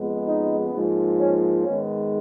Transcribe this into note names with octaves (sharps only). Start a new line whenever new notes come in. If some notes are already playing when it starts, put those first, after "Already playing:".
Already playing: F2 C#3 G#3 B3
D#4
G#2 F3 A#3
C#4
G#2 D#3 G#3 B3 C#4